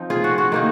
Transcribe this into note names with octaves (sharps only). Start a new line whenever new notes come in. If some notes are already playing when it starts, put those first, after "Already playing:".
Already playing: F3 C4 D#4
F4 G#4
F#4
F#4
D#3 A#3 D#4